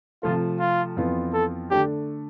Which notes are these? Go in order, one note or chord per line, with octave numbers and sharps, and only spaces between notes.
C3 F3 A3 F4
F4
F2 E3 B3 F4
A4
D3 A3 D4 G4